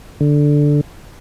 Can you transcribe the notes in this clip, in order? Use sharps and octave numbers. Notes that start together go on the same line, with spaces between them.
D3